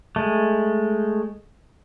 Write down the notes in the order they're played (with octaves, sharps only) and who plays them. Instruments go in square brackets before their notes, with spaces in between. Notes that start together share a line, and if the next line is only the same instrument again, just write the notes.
[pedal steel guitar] G#3 A3